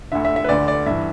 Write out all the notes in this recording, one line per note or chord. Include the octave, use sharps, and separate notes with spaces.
D2 D3 E5
E5
E5
B4
D2 D3 D5
D5
G2 E3 E5